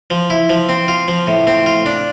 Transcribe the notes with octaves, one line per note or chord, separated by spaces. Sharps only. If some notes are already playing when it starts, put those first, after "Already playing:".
F3
E4
F3
C4
F4
F3
A2
C4
F4
D4